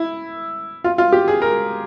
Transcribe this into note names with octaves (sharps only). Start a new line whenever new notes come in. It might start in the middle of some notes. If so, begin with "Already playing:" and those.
Already playing: E4
F4
F4
G4
G#4
A#4